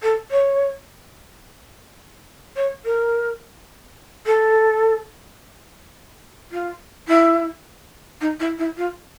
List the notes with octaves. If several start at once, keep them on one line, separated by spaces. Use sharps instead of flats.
A4
C#5
C#5
A#4
A4
F4
E4
D#4
E4
E4
F4